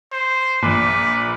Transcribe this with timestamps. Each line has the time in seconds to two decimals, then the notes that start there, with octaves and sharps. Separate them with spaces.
0.12 C5
0.62 A#1 A#2 B4